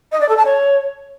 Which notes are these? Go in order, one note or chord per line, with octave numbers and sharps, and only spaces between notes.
D#5
D5
A4
A5
C#5